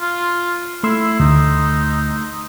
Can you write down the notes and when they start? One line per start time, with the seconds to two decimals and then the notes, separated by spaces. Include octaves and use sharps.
0.01 F4
0.83 A3 E4 C6 E6
1.20 D2 D#4